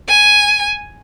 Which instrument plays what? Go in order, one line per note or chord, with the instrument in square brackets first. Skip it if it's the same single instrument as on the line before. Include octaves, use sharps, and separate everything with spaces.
[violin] G#5